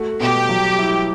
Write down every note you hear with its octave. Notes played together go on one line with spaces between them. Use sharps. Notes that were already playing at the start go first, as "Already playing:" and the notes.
Already playing: A3 F#4
B2 G4
F#3
E4